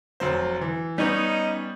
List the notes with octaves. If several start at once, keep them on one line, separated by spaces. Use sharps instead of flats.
F1 F#3 C5
E3
G3 B3 C#4 D#4